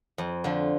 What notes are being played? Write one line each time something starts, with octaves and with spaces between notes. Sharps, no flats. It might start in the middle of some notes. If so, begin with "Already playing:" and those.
F2
D3 F3